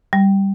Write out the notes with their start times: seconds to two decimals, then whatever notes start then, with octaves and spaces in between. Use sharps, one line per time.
0.13 G3